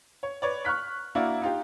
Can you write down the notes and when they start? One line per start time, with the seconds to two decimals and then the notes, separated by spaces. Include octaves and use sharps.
0.23 C#5
0.42 B4 C#5 D5
0.65 C#6 F6 F#6 B6
1.15 A#3 D4 E4 F#4 D5
1.42 D#4 F4 G4